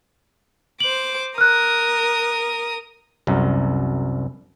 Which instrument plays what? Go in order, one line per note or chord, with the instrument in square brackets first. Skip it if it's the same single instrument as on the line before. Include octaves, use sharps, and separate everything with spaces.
[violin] C5 D6 [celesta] F#7
[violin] A#4 D#6 [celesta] F6 F#6
[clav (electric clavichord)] C2 F#2